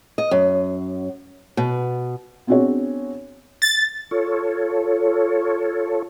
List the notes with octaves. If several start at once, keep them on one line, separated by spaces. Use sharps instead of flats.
D#5
F#2
B2
B3 C4 D4 F#4 G#4 C#5
A6
F4 A4 C#5